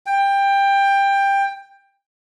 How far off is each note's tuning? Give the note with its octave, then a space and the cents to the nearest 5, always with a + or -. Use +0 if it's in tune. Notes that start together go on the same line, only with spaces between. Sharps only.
G5 +15